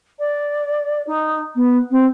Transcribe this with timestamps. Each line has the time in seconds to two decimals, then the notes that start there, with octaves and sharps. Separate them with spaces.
0.19 D5
1.07 D#4
1.55 B3
1.91 C4